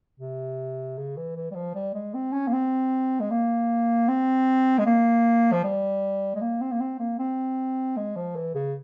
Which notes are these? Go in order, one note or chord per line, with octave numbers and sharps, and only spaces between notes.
C3
C#3
E3
E3
G3
F3
G3
G#3
C4
C#4
A#3
C4
G#3
A#3
C4
G#3
A#3
F3
G3
G#3
A#3
C4
A#3
C4
A#3
C4
G#3
F3
E3
C#3